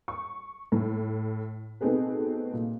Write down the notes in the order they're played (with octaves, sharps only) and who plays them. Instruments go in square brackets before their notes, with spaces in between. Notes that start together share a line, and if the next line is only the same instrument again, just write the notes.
[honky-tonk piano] C#6
A2
B2 A3 C4 D#4 G#4 B4
A#2